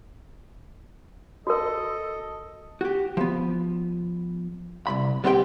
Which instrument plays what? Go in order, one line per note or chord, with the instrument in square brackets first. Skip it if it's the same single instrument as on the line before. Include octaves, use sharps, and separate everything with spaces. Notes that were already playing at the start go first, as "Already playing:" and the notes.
[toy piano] F#4 A#4 [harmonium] A4 D#5
[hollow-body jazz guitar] F#4 G4
F3 B3
C2 G2 B5
G3 B3 C4 E4 G4 G5